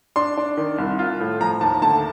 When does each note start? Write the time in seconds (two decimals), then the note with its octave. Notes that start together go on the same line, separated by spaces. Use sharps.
0.16 D4 C6
0.37 D4
0.57 D#3
0.78 C2
0.99 F4
1.20 A2
1.41 F3 A#5
1.61 D#2 A5
1.82 D2 A5